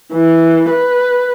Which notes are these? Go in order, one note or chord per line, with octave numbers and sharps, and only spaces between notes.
E3
B4